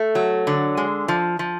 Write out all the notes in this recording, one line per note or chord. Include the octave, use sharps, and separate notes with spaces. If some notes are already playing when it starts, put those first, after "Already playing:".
Already playing: A3
F#3
D3
G#3
F3
F3